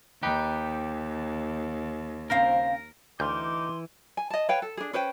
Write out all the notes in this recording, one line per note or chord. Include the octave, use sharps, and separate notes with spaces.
D#2 D#4 G4 B4
C#3 C4 A#4 F5
D2 E3 D#4 G5 C6 D6 F6 G6
G#5
D#5 A5
B4 C#5 F5 G5
A4
D4 G#4
C#4 B4 C5 G5